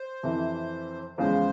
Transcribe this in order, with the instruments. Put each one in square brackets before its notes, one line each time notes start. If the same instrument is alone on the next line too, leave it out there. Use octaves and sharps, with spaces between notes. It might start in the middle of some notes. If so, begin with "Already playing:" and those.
Already playing: [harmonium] C5
[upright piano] F2 C3 E3
[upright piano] E2 C#3 F3 G#3 [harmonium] C5